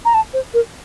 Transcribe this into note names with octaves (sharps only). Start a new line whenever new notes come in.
A#5
A5
C5
A#4